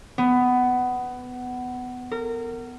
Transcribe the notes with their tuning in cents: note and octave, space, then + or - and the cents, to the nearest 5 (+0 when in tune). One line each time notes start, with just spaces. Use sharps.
B3 +15
A#4 -25